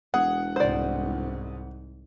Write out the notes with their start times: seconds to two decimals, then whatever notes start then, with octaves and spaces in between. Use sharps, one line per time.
0.14 E1 G#4 F#5
0.56 C2 G#2 C5 D5